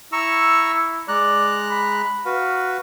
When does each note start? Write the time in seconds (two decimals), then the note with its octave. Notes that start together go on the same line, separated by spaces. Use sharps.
0.12 E4 A#5 C#6 E6
1.08 G#3 D5 A#5 F#6
1.70 B5
2.26 F#4 B4 F5